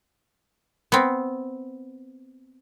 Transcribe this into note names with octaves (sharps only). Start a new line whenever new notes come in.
B3 C4